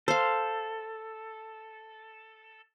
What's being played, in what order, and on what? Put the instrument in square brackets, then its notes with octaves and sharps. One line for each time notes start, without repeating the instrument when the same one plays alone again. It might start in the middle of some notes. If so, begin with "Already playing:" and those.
[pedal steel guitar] A4 [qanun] C5 F5